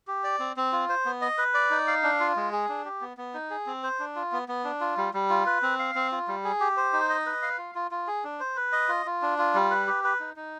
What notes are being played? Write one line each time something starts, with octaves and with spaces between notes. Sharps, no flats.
G4
D5
C4
C4
F4
C5
B3
D#5
B4
D5
D#4
F5
D4
F4
G#3
G#4
D4
G4
B3
B3
D#4
G#4
C4
C5
D4
F4
B3
B3
D4
F4
G3
G3
F4
B4
C4
F5
C4
F4
G3
G#4
G4
C5
D#4
D#5
B4
F5
F4
F4
F4
G#4
D4
C5
B4
D#5
F4
F4
D4
F4
G3
B4
G4
B4
D#4
D#4